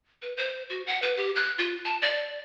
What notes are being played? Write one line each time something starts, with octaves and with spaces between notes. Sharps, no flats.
B4
C5
F#4
F#5
B4
G4
F#6
F4
A5
D5